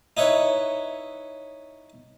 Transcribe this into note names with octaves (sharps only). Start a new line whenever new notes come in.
D#4 E4 B4 C#5